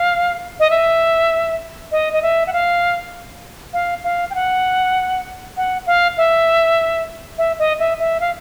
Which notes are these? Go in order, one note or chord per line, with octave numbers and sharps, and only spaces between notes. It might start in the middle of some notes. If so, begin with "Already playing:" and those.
Already playing: F5
D#5
E5
D#5
D#5
E5
F#5
F5
F5
F5
G5
F#5
F#5
F5
E5
E5
D#5
E5
E5
F5